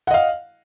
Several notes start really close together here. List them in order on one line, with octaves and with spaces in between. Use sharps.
F#5 D#5 F5